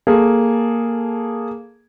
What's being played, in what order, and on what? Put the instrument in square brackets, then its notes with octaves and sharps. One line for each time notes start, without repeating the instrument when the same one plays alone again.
[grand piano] A#3 G#4 A4